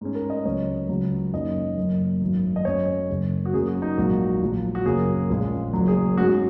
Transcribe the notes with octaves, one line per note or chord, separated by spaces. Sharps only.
G#2 G#3 C#4
A#4
D#5
C#2 C#3 F#3 C#4 C#5
C#2 C#3 F#3 C#4
F#1 F#2 D#3 A#3 C#4 D#5
F#1 F#2 F#3
G#1 F#2 F#3
D#5
F#2 F#3 C#4 C#5
F#1 F#2 C#3
F#4
F#2 F#3 A#3 C#4 G#4
F#4
D#4
A#1 G#2 F#3 A#3 F#4
A#1 A#2 F#3
F#4
F#2 C#3 A#3 C#4 G#4
A#1 A#2 G#3 C#4
F#1 F#2 F#3
G#4
G#2 G#3 C#4 F#4